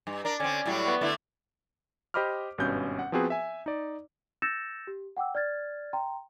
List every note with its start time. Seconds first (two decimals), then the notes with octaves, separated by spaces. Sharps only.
0.07 G2
0.25 D4 A#4
0.40 D3 C4 C#4
0.66 A2 F#3 G3
0.87 B3
1.01 D3 A3 E4
2.14 G4 C5 D#5 B5 D6 F6
2.58 G#1 G2 B2 C#4 G6
2.99 F#5
3.12 F3 B3 C4 F#4 G#4 B4
3.30 E5 G#5
3.66 D#4 D5
4.42 E6 G6 A6 A#6 C#7 E7
4.87 G4
5.17 F#5 G5 D6 E6
5.35 D5 F6 G#6 A6
5.93 G5 A#5 C6